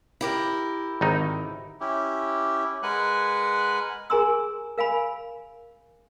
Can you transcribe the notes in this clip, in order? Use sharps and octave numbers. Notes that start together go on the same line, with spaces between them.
E4 G4 A#4
G#1 D#3 D#4
C#4 E4 G4
G#3 A#4 B4 F#5 G#5 F#6
G#4 A#4 G#5 A#5 C6 E6
A#4 F5 G#5 B5